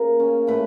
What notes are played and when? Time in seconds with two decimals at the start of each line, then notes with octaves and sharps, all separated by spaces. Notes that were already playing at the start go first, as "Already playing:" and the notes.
Already playing: C#3 A#3 A#4
0.20 C#4
0.47 A2 B4